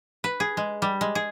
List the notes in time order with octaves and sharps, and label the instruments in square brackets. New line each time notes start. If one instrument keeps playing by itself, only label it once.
[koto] B4
G#4
G#3
G3
G#3
G#4